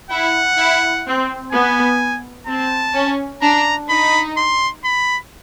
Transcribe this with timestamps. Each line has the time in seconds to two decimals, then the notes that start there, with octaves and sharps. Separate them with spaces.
0.10 E4 F#5
0.58 E4
1.06 C4
1.52 B3 G#5
2.47 C4 A5
2.95 C#4
3.42 D4 A#5
3.89 D#4 B5
4.37 C6
4.85 B5